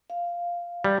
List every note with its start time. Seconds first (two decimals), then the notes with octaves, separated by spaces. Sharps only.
0.10 F5
0.84 G3